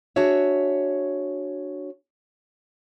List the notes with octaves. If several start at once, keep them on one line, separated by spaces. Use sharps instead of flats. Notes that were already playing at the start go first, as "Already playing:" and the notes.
D4 F#4 G#4 C#5 E5